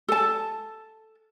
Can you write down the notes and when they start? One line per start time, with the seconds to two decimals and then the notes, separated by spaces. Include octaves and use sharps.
0.08 A4 A5